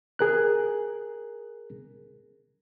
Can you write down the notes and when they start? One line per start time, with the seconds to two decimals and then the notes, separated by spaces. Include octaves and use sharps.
0.19 G#4 A#4 F#6